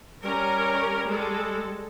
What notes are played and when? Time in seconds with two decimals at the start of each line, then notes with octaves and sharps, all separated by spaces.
0.23 G3 C#4 A#4
1.07 G#3 A4